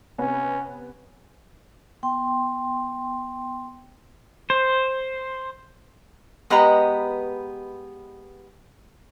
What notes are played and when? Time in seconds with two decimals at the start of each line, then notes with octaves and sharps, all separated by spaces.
0.18 C3 B3 C#4
2.03 B3 G5 C6
4.50 C5
6.50 G#3 B3 G4 B4 D#5 A#5